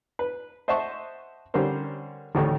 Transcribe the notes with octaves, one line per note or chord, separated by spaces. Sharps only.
B4
C5 D#5 E5 F#5 A5 C#6
D3 G3 C#4 A#4 C5
A1 D2 A2 D#3 A4